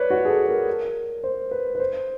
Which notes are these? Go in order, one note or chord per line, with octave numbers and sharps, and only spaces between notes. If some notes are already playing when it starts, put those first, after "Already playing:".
Already playing: B4 C#5 D5
F#4
G#4
A4
A#4
C5
B4
B4
C5